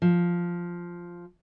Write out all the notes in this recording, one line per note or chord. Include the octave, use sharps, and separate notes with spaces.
F3